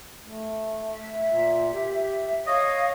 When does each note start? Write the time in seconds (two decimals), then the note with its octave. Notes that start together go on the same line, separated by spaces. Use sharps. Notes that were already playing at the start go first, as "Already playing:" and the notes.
0.22 A3
0.90 E5
1.28 A#2
1.74 G4
2.47 C#5 D#5 F5